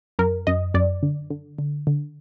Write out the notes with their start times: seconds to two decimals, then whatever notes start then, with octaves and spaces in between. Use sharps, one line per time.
0.19 F#2 A#4
0.47 F#2 D#5
0.74 F#2 D5
1.03 D3
1.31 D3
1.59 D3
1.87 D3